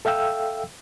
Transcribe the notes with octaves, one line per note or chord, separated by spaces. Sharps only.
A4 E5 F5 G5 E6